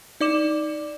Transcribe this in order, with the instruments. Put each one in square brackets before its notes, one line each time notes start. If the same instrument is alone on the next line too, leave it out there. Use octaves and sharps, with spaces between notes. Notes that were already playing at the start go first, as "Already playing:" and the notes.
[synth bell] D#4 D5 D6 E7